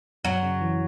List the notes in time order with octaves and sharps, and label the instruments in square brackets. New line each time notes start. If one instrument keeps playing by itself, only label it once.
[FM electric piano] F#2 [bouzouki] F#3
[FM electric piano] C#3
E3